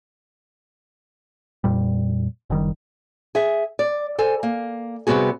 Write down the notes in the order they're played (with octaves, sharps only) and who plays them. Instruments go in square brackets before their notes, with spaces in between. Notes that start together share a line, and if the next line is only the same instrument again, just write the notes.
[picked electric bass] F2 A#2 G3
F#1 D#3 G3
[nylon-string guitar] G#4 E5
D5
A4 C5 G#5
A#3
C3 G3 B3 F#4 G#4